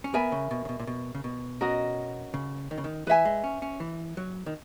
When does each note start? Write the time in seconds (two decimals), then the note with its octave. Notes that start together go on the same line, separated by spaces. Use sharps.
0.04 C#4
0.14 B3 A#4 E5 G#5 B5
0.32 C#3
0.51 B2
0.65 C#3
0.69 B2
0.80 A#2
0.87 B2
1.15 C#3
1.24 B2
1.61 C#4 F#4 A#4 D#5
2.34 C#3
2.71 D#3
2.78 C#3
2.84 D#3
3.07 E3 B4 E5 G#5
3.25 G#3
3.44 C#4
3.62 C#4
3.80 E3
4.17 F#3
4.46 D#3